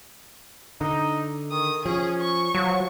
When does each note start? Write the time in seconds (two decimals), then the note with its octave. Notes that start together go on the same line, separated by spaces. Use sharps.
0.81 D3 D#4
1.51 D#3 D#6
1.86 F3 C#4 G#4
2.20 C#6
2.55 F3 F#3